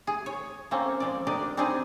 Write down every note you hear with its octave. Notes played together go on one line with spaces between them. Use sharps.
G#4
C#5
A#3 C4 C#4 A4
F3 G#3 D5
D4 G4 A#4 D5 D#5
C4 D4 D#4 G#4 B4 D#5